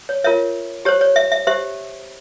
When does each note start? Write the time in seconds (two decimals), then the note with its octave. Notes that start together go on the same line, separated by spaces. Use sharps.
0.09 C#5
0.24 F4 A#4 C#5 E5
0.85 G4 C5 C#5
1.01 C#5
1.16 E5
1.32 E5
1.47 G4 C5 E5